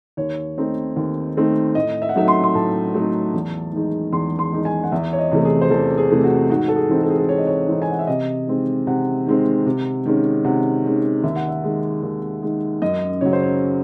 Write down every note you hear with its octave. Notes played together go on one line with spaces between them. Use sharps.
D#2 C#5
D#3 A3 C4 D#4
D#2
D#3 A3 C4 D#4
A2 D#5
E5
F#5
F#3 A3 D#4 E5
C6
C6
A2 A5
F#3 A3 D#4
E2
D#3 G#3 D#4
E2 C6
C6
D#3 G#3 D#4
G#5
F#5
E2 E5
C#5
D#5
C3 E3 A3
G#4
C5
E2 A4
G#4
C3 E3 A3
F#4
G#2 F#4
A4
G#4
E3 C4 D#4
A4
G#4
A4
G#2 C#5
D#5
C#5
E3 C4 D#4
G#5
F#5
E5
C3 D#5
D#3 G#3 C4
C3 F#5
D#3 G#3 C4
C3
D#3 G#3 C#4
C3 F#5
D#3 G#3 C#4
D#2 E5
F#5
E5
D#3 G#3
D#2
D#3 G#3
F#2 D#5
C#3 F#3 C#5
C5
C#5